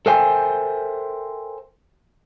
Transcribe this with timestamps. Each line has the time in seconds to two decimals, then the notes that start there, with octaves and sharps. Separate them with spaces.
0.06 A4 A#4 C5 E5 G5 G#5